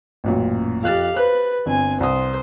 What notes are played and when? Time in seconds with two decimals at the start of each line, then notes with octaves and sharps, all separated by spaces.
0.24 A1 F#2 A#2
0.84 F2 G4 F5 F#6 A6
1.16 B4 C5 F#6
1.66 G1 C4 G#5
2.00 C2 C5 D#6